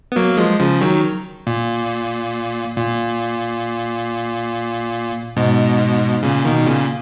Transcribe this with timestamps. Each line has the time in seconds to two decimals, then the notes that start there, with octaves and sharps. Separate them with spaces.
0.12 B3
0.16 F#3 A#3
0.37 F3 G#3
0.59 C#3 F3
0.81 D#3 F#3
1.47 A#2
2.77 A#2
5.37 G#2 B2
6.23 A#2 C#3
6.45 B2 D#3
6.66 A#2 C#3